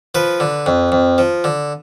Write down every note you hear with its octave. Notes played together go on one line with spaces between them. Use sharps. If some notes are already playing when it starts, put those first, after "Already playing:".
F3 B4
D3
F2
F2
F3
D3